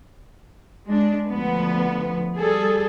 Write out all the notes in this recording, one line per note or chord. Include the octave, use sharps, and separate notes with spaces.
G#3 D4
D2 F3 B3
G3 G#4 A4